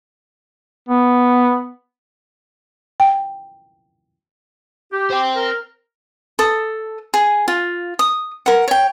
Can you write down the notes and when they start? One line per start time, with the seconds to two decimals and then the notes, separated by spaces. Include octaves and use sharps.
0.89 B3
3.00 G5
4.92 G4
5.11 C5 G5
5.35 A#4
6.39 A4 D#6
7.14 G#4
7.48 F4
7.99 D#6
8.46 A#4 F#5
8.68 C#5 G5